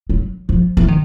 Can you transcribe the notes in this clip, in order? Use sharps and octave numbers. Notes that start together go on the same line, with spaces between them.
F#3
F3
E3
D#3